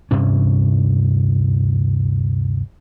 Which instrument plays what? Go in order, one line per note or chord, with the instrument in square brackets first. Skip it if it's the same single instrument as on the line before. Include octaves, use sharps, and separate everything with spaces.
[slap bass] D2 G2 C3 C#4